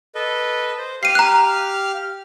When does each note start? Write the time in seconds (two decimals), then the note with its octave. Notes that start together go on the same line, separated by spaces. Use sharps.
0.15 A4 B4 D#5
0.78 C5
1.03 G4 F5 F6 C7 D#7
1.15 A#5 F#6